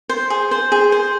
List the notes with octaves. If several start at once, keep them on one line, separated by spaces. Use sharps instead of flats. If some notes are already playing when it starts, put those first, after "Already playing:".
C5
G#4
C5
G#4
C5